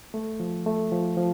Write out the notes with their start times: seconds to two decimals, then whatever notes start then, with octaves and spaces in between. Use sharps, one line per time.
0.14 A3
0.40 F3
0.66 A3
0.92 F3
1.17 F3